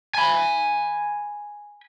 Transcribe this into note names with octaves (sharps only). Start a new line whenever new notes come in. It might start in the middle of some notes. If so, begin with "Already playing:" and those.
G#5 B5